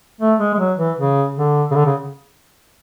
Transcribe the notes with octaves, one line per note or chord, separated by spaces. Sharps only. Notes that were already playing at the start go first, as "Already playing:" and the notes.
A3
G#3
G#3
F#3
E3
C#3
D3
C#3
D3
C#3